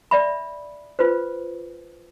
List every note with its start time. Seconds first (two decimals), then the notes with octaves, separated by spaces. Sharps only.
0.11 D5 E5 B5
0.99 F4 B4 C5